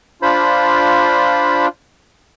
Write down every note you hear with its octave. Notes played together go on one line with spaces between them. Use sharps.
D4 F4 C5 B5